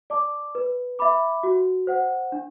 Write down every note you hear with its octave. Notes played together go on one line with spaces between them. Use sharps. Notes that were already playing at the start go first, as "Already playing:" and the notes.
D5 A5 D6
B4
E5 B5 D6
F#4
C5 F#5
D4